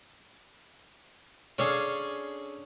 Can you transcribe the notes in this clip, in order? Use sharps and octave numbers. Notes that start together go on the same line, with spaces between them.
C#4 D4 G#4 A4 C#5 F5